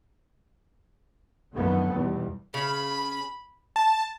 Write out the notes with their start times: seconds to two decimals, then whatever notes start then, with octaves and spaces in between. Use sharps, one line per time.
1.55 F#2 D3 D#3 F3 A3 B3
1.93 E2 B2 G3
2.54 C#3 B5
3.76 A5